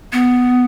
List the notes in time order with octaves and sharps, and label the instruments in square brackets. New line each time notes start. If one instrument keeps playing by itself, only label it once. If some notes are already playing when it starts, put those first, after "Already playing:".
[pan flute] B3